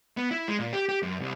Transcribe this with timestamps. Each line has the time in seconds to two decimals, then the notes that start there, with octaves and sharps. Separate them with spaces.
0.17 B3
0.31 E4
0.48 G#3
0.59 A#2
0.73 G4
0.89 G4
1.02 F#2
1.20 C2